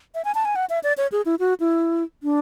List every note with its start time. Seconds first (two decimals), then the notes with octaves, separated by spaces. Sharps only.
0.15 E5
0.25 G#5
0.35 A5
0.45 G#5
0.56 F#5
0.70 E5
0.83 D5
0.97 C#5
1.12 G#4
1.26 E4
1.39 F#4
1.60 E4
2.23 D4